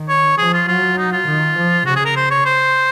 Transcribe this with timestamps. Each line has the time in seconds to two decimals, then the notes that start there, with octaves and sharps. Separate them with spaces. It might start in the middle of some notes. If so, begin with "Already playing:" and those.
Already playing: D#3
0.09 C#5
0.38 F3 G#4
0.53 F4
0.68 F#3 F4
0.98 D#4
1.12 F4
1.27 D#3
1.57 F3
1.86 C#3 F#4
1.96 G#4
2.05 A#4
2.16 C5
2.31 C#5
2.45 C5